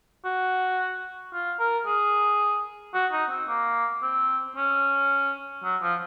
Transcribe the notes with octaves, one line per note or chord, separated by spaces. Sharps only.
F#4
F4
A#4
G#4
F#4
D#4
C4
A#3
C4
C#4
F#3
F3